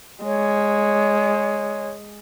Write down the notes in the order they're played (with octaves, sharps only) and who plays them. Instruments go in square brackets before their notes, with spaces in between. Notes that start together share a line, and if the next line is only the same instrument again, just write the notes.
[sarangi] G#3 [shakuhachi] C#5